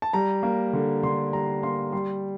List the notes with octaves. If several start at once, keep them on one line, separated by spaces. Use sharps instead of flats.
A5
G3 A#5
A#3
D3
D3 C6
G3 A#5
A#3 C6
G3 C6